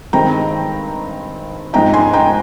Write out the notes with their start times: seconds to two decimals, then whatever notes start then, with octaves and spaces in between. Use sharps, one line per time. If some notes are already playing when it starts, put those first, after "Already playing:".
0.13 G2 D#3 G#3 C4 G5 A#5
1.73 G#2 F3 G#3 C4 D#4 G5 A#5
1.94 G#5 C6
2.13 G5 A#5